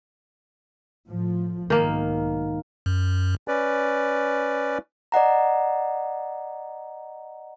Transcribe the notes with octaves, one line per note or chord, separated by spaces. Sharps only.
A2 F3
B1 G#2 D#3 A#3
F#2
C#4 B4 D5
D5 D#5 F#5 A#5